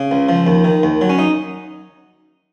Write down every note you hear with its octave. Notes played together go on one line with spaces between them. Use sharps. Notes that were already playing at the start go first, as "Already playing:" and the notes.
Already playing: C#3
C#2
F3
D#2
D#3
D#2
F#3
C#4
D#4